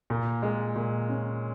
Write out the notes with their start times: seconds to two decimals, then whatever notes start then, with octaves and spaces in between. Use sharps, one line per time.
0.10 A#2
0.43 G#3
0.76 A#2
1.09 C#4